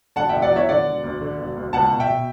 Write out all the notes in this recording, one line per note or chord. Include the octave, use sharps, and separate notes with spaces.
D3 F#5 A5
E1 E5 G5
D5 F#5
E2 C#5 E5
D3 D5 F#5
E1
D2
D3
E1
D2
C#2 F#5 A5
B2
E5 G5
B2